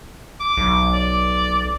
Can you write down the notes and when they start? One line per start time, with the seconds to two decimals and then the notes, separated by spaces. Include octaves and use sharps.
0.40 D6
0.57 B1
0.94 D5